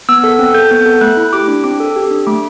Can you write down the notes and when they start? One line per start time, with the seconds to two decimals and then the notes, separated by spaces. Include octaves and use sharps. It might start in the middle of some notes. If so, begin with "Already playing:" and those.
0.09 B3 E6
0.24 A4
0.39 C4
0.54 A4 G6
0.71 B3 G6
0.86 A4
1.01 A3 F#6
1.17 E4
1.33 G4 D6
1.48 D4
1.64 C4 D6
1.80 A4
1.96 G4
2.11 D4
2.27 A3 D6